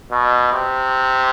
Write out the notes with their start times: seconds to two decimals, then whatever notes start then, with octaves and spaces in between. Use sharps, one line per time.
0.11 B2
0.53 C3